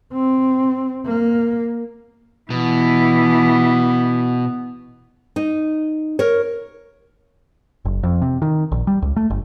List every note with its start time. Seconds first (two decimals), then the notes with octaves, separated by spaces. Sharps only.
0.12 C4
1.06 A#3
2.50 B2 E3 B3
5.36 D#4
6.19 A#4 C#5
7.85 F#1
8.03 F2
8.22 C3
8.42 D#3
8.72 A#1
8.87 G3
9.02 C#2
9.16 A3
9.30 G1